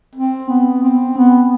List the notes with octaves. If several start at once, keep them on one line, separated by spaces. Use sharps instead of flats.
C4
B3
C4
B3